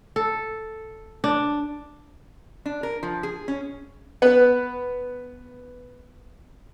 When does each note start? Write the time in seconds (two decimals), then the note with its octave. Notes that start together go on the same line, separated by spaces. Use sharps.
0.16 A4
1.24 D4
2.66 D4
2.83 A#4
3.03 F3
3.23 G#4
3.48 C#4
4.22 B3 B4